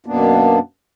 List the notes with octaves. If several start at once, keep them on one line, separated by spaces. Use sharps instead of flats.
F#2 B2 A#3 B3 D4